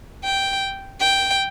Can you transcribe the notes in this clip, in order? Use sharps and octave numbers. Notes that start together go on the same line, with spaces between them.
G5
G5